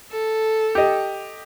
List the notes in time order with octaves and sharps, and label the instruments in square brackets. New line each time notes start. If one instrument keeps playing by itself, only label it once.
[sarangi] A4
[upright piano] G4 D#5